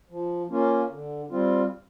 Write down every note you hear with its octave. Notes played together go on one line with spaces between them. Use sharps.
F3
A#3 C#4 F4
D3
G3 C4 F4